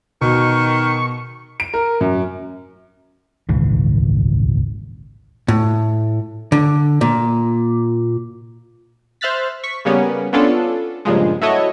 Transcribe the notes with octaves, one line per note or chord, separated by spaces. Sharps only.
B2 D#3 C#6
D7
A#4
F#2
D#1 G#1 C#2 E3
A2
D3
A#2
C5 E5 F6 F#6 A6 B6
C#6 B6
C#3 G3 A#3 B3 C#4
B3 C#4 D4 F4 A4
G2 A#2 C#3 F3 G#3
E4 F#4 A4 C#5 D#5